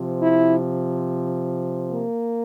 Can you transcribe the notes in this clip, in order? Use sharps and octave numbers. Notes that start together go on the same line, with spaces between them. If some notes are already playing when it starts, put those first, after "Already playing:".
Already playing: C3 F3
E4
A#3